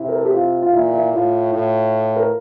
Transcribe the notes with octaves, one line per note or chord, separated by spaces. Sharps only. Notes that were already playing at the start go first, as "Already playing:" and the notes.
Already playing: C3 E4
A#4
A4
G4
F4
F4
A#2 E4
E4
A2 F4
A2
A#4